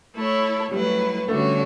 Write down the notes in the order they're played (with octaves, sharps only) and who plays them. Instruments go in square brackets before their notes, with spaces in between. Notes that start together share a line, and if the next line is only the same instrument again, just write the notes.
[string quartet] A3 E4 A4 C#5
[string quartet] F#3 A3 E4 B4 [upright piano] G3
[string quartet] D3 G3 C#4 F#4 C#5 [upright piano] A3